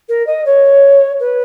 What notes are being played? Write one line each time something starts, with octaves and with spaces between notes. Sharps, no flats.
A#4
D#5
C#5
B4